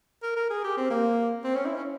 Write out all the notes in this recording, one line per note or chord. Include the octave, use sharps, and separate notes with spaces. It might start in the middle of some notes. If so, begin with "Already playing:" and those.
A#4
A#4
G#4
G4
C4
A#3
C4
C#4
E4
C#4